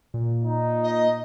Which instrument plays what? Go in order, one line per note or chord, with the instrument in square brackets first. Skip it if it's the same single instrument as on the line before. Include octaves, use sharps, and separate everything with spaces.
[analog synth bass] A#2
[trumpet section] D#4
[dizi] D#5